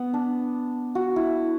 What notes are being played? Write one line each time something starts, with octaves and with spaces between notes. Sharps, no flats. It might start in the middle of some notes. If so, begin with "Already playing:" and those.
Already playing: B3
D4
F#4
E4